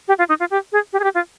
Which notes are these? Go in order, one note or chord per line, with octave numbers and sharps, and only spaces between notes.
G4
F4
D#4
F4
G4
G#4
G4
G#4
G4
F4